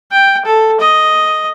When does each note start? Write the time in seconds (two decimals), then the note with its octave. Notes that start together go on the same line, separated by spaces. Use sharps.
0.11 G5
0.45 A4
0.80 D#5